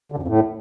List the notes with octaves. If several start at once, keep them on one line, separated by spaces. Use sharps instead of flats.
D3
F#2
F2
A2